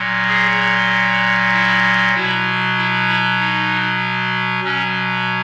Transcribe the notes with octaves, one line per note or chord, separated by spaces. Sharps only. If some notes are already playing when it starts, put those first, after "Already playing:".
Already playing: A#2 F#3
G#4
E4
B2 F#3 E4
E4
E4
D#4
B2 F#3 C#4